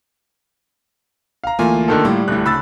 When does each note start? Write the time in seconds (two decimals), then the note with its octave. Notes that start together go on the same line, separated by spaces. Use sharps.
1.44 F5 A#5
1.59 D2 E3 A3 A#3 F4 G#5
1.88 D3 D#3 A4
2.05 A2 G3
2.28 D1 A2 F#6
2.46 C#3 D4 B5 E6 A6